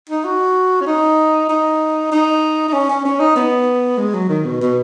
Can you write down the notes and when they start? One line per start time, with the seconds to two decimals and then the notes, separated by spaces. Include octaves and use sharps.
0.09 D#4
0.25 F#4
0.81 C#4
0.87 D#4
1.49 D#4
2.11 D#4
2.68 D#4
2.73 C#4
2.90 C#4
3.05 C#4
3.20 D#4
3.36 B3
3.98 G#3
4.14 F#3
4.29 D#3
4.45 B2
4.61 B2